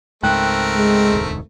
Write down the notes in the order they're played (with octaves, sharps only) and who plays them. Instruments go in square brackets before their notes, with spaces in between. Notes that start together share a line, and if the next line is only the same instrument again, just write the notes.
[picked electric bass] C#2 G#2 [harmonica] A3 C4 A#4 [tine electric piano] G5 F#6
[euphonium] G#3
[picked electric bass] E1 D2 G#2